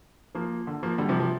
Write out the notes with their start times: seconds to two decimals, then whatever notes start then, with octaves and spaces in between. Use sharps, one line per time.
0.35 F3 A#3
0.67 D3
0.83 F3 A#3
0.98 D3 G3
1.09 C3 F3
1.19 C3 F3